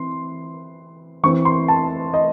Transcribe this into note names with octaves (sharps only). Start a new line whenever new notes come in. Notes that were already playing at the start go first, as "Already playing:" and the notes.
Already playing: E3 C4 C6
E3 C4 C#6
C6
A5
D#5